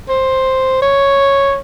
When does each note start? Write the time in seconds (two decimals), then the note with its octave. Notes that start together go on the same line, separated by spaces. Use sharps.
0.09 C5
0.82 C#5